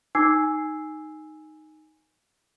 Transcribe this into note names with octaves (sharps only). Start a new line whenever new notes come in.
D#4 G#5 D6 E6 G#6 C7